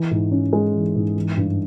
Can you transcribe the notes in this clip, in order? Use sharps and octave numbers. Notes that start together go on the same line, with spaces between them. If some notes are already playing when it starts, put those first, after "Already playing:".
Already playing: E3
G#2
C#4
G#3
E3
G#2
E3
G2